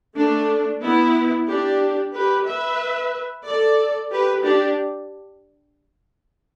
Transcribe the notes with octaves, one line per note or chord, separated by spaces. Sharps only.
A3 D4
B3 E4
D4 G4
G4 B4
B4 E5
A4 D5
G4 B4
D4 G4